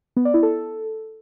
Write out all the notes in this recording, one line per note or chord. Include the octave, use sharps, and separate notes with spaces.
B3
D5
E4
A4